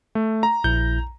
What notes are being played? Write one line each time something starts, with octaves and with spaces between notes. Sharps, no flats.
A3
A#5
A#1 E4 G6